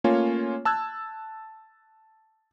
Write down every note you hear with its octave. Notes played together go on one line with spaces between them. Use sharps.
A3 A#3 C#4 F4 C#5 G#5
A5 E6 F#6 G#6